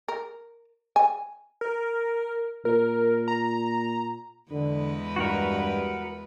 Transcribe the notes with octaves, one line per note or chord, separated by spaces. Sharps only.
A#4
G#5
A#4
A#2 A#4
A#5
E2 D3 G#3 B4
G2 F#4 A#4